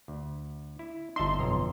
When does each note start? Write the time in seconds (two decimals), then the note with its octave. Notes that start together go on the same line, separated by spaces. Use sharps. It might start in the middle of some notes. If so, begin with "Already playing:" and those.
0.08 D2
0.79 E4
1.16 G1 D#4 E5 A5 C6
1.39 B1 F2 A#5